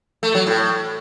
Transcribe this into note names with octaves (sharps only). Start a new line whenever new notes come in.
A3
F#3
A2